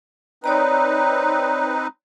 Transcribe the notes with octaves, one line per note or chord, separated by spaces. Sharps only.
C4 D#4 B4 C#5 D5 A#5